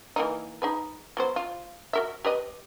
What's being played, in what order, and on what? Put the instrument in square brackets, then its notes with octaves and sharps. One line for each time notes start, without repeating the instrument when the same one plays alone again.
[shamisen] E3 A#3 D#4
D#4 G#4 B4
F#3 B3 C5
F4
F#4 A#4 E5
G4 B4 D#5